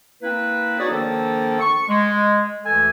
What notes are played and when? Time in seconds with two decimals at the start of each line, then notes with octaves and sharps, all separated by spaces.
0.21 A#3 C4 E4 B4
0.78 D#4 F#4 G#4 B4 C#5 D5
0.90 D#3 F3 A#3 D4 A4
1.60 C#6
1.89 G#3
2.66 D2 E3 A4 G#5